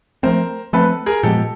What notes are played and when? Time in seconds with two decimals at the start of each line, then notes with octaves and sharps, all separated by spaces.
0.23 F3 A3 C4 A#4 C5
0.73 F3 A3 C4 A4 B4
1.06 G#4 A#4
1.23 A#2 F3 G#3 B3 G4 A4